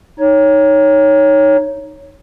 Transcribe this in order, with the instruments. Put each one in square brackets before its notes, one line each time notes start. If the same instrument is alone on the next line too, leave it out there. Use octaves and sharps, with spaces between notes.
[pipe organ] D#4 C#5